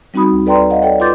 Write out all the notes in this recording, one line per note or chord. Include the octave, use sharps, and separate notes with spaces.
G3 C4 D#4 F#4 B5 D#6
D2
A4 B4 D5 G5 A#5 C6
D#5 F5 F#5
A4 C#5 D5 G5
F4 B4 C6 D6 G6 A6